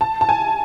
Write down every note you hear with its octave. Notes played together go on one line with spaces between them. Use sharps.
A5
A5
G#5